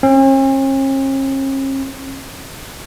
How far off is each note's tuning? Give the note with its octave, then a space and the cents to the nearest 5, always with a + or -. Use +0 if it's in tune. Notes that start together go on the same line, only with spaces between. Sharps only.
C#4 -45